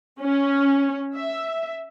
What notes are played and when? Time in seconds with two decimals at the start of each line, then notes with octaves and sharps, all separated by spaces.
0.21 C#4
1.14 E5